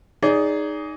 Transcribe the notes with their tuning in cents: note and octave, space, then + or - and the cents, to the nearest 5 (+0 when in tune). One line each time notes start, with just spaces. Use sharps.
D#4 -5 G#4 +0 D5 -35